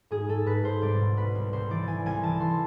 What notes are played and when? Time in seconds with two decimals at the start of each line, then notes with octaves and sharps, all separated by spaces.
0.11 G#2 G#4
0.29 G#2 A4
0.46 G#2 B4
0.64 G#2 C5
0.81 C2 D5
1.00 B2
1.17 B2 B4
1.35 C2
1.53 C2 C5
1.70 E3 D5
1.88 E3 G#5
2.06 C2 G#5
2.23 E3 A5
2.40 E3 C6